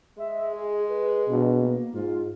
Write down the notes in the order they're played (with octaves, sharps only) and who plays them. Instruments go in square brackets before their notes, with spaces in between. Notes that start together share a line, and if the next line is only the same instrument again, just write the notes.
[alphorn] G#3 [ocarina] E5
[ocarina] G#4
B4
[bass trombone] B2 [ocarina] D4
[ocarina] A#3
[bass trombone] G#2 [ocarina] F4